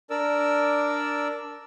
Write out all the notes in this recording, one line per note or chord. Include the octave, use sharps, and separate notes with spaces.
D4 A#4 D5 E6